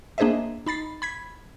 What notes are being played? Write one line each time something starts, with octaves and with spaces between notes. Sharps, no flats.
A#3 D4 G#4 C5 D#5 E5
D#4 B5 A6 C7
B5 G#6 B6